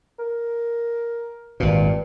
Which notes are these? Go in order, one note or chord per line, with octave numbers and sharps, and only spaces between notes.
A#4
G#1 G2 A#2